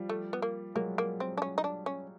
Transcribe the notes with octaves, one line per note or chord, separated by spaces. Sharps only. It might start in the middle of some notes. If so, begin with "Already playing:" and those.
Already playing: F3 G3
A3
B3
A#3
F#3 G#3 A#3
A#3
C4
D4
C#4
D#4
D4
C#4